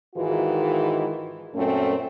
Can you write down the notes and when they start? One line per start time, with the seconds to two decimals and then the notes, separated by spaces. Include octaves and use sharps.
0.15 G#2 D#3 E3 G#3 F4 F#4
1.54 F#2 A#2 A3 C4 C#4